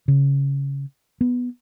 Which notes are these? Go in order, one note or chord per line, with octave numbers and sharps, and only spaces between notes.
C#3
B3